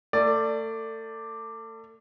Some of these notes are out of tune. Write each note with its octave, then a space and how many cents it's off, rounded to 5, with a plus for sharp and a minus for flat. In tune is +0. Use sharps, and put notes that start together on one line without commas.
A3 +35 D5 +0